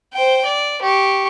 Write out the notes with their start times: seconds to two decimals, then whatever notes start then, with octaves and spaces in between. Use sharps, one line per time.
0.13 C5 G5
0.45 D5
0.82 G4 C#6